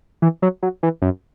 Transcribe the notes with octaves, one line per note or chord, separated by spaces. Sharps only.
E3
F#3
F#3
E3
F#2